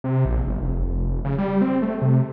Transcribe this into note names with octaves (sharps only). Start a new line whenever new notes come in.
C3
A#1
G1
F1
C#3
G3
C4
A3
C3